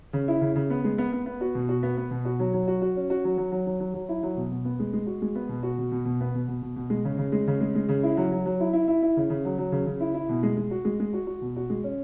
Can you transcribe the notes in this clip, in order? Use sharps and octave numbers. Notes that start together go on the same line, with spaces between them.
C#3
E4
C#3
C#3
B3
G#3
B3
B3
B3
F#4
B2
F#4
B3
B3
B2
F#4
F#3
F#3
F#4
F#4
C#4
F#4
F#3
F#3
F#3
F#3
F#3
F#3
E4
F#3
B2
B2
B3
G#3
G#3
F#4
G#3
B3
B2
F#4
B2
B2
B2
B3
B2
B2
B2
B2
G#3
C#3
C#3
G#3
C#3
G#3
G#3
C#3
E4
F#3
F#3
F#3
E4
E4
E4
E4
C#3
C#3
F#3
F#3
C#3
C#3
E4
E4
B2
G#3
G#3
F#4
G#3
G#3
F#4
F#4
B2
F#4
G#3
C#4